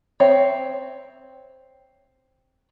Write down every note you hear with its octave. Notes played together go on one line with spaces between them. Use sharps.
C4 C#5 E5 G5